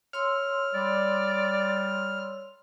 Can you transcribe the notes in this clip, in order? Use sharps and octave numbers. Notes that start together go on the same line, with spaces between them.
C#5 C6 E6 F6
G3 D5